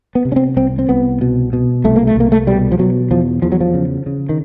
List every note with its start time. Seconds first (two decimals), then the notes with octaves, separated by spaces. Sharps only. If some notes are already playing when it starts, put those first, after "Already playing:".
0.15 B3
0.25 C3
0.32 C#4
0.36 C4
0.57 C2 C4
0.79 C4
0.89 C2 B3
1.21 B2
1.53 B2
1.84 C2 A3
1.96 A#3
2.07 A3
2.16 C2 A#3
2.32 A3
2.47 B2 G3
2.72 F3
2.79 B2 F#3
3.11 E2 F3
3.42 E2 F3
3.52 F#3
3.61 F3
3.74 C#3
4.06 C#3
4.29 D#3